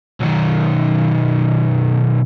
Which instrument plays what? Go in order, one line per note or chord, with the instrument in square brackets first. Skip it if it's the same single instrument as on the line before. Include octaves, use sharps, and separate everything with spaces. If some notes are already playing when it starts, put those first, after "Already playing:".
[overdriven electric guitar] B1 D#3